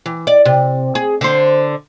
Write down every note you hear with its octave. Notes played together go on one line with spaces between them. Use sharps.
E3
D5
C3
G#4
D3 C5